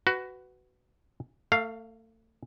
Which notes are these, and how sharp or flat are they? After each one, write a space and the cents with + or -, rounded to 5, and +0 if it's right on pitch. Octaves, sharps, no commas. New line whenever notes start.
F#4 +10 B4 +15
A3 +30 F5 +0